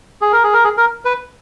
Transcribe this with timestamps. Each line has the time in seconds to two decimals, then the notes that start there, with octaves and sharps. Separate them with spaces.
0.22 G#4
0.32 A#4
0.43 G#4
0.53 A#4
0.64 G#4
0.77 A#4
1.05 B4